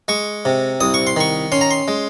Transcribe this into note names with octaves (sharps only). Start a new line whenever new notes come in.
G#3 C#6
C3
C2 D#6
C#6
C6
D#3 C#6
C#4 C6
A#5
C6
G#3